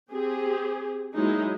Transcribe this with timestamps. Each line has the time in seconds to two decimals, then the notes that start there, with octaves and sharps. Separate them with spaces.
0.10 C4 G4 G#4
1.15 F#3 G#3 A#3 D#4 E4 G#4